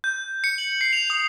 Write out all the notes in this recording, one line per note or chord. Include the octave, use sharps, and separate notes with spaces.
G6
C#7
F#7
C7
F7
D#6